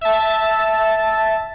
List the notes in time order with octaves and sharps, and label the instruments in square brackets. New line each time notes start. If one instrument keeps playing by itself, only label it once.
[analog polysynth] E5 A5